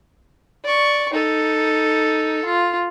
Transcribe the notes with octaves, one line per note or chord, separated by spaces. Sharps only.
D5 C#6
D#4 A4
F4